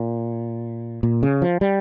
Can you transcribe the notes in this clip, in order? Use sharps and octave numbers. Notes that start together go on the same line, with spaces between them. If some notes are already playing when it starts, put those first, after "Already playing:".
Already playing: A#2
A#2
C#3
F3
G3